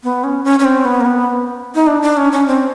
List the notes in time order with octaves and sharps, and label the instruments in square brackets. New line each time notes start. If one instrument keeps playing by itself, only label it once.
[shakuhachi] B3
C#4
C#4
C#4
C4
B3
A#3
B3
D#4
D4
D4
C#4
C#4
C4